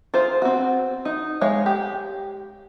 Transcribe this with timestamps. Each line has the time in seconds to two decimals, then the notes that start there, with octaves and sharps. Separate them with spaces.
0.14 F4 G#4 C5
0.42 C4 F#4
1.05 D#4
1.41 G#3 C#5 F5
1.66 G4